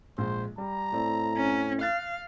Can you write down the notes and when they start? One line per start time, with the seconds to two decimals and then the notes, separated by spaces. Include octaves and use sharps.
0.18 A#1 G#3 C5
0.58 G3 A#5
0.93 A2 C4 D5
1.37 C#4
1.81 F5 F#6 A6